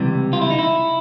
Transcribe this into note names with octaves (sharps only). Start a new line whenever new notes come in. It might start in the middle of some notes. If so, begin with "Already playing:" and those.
Already playing: C#2 C3 E3 G3
F4
E4
D#4
E4